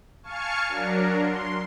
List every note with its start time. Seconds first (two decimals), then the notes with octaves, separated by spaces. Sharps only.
0.23 F5 G#5 A5 C#6 F6 C#7
0.68 F#3 D4 A#4
1.17 C6